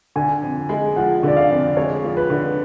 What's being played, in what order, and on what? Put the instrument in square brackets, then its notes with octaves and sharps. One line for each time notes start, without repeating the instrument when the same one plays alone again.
[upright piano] D3 [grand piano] G#5
[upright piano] F2
G#3
[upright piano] F3 [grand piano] F#5
[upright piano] D3 [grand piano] D5
[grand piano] F5
[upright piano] F2
[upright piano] G#3 [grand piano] C#5
[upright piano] F3
[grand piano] B4
[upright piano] D3